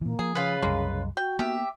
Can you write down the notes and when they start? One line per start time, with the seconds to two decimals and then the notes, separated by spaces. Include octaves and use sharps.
0.01 A#2 E3 A#3
0.19 F3 G#4
0.35 C#3 F4 B4
0.62 C2 F#2 G3 G#3 A#3
1.17 F#4 G5
1.39 D#3 A#3 B3 G4 E5